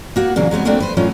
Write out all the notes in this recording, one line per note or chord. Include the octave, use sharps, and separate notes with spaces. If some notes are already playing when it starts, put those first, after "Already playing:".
A#3 F#4 F#5
A#2 C#3 E3 F#3
F#3 G#3 B3 C4
F#3 A3 A#3 C4 D4
B4 C5
A2 F#3 C#4 F4